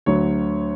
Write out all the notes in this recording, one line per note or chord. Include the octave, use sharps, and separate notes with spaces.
D2 D3 F#3 C#5